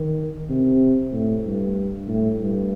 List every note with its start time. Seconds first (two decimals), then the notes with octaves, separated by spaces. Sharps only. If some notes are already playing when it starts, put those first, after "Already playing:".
Already playing: D#3
0.50 C3
1.12 A2
1.45 G2
2.08 A2
2.41 G2